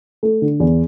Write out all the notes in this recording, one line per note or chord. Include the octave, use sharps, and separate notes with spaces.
A3
D3
E2